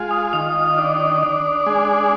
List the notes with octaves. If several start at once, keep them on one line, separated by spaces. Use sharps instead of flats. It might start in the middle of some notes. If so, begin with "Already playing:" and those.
Already playing: G#3 F4
D#6
D#3 D#6
D4
D4
G#3